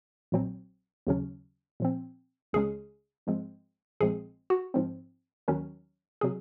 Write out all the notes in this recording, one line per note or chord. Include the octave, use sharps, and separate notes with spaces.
A#1 A#2 F#3 C4
D#2 C#3 F#3 C#4
A#2 F3 C4
C#2 C#3 G#3 C#4 G#4
G#2 F3 G#3 C4
A#1 A#2 F3 G#3 C4 G#4
F#4
G#2 F3 C4
D#2 D#3 F#3 C#4
C3 F#3 G#4